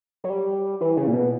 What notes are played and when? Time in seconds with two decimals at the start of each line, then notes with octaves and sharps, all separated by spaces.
0.24 F#3
0.30 G3
0.81 E3
0.97 C#3
1.08 A#2
1.13 B2